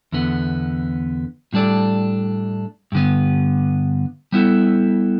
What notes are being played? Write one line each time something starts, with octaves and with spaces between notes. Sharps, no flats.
E2 D3 B3
A2 G3 D4 A4 D5
G2 D3 B3
G3 B3 E4 A4